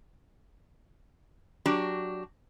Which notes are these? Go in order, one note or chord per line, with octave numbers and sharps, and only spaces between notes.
F#3 D4 F#4 G4